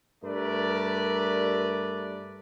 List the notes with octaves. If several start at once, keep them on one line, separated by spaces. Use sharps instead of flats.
G2 A3 A#4 B4 D5